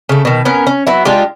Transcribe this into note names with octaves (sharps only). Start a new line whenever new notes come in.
C#3 A3
B2 D#3
B3 C#4 A#4
C#4
F#3 B3 E4
G#3 D4 F4 G4